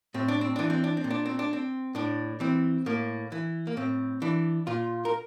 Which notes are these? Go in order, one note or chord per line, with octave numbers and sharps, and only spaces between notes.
A2 C4
D4
C4
E3 D4
C4
D4
C4
A#2
D4
C4
D4
C4
A2 D4
E3 C4
A2 A#3
E3
A#3
A2 C4
E3 D4
A#2 F4
A#4